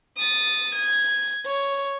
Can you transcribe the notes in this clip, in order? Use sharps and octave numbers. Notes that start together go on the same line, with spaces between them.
D#6 A6
G#6
C#5